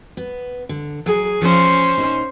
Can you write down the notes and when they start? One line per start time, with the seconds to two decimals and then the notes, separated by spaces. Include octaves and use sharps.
0.17 B3
0.69 D3
1.06 F#3 G#4
1.42 F3 C#4 C5
1.98 A#2 D#4